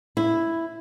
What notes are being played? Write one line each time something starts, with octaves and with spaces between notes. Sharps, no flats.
E4